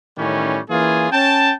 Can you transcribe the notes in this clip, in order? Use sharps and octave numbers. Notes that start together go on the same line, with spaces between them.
A2 D#3 E3 G3 C#4
E3 A#3 C#4 F4 G#4 G#5
C#4 G5 A5